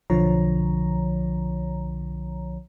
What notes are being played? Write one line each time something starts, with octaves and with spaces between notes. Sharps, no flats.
B1 D3 F3 C#5 A#5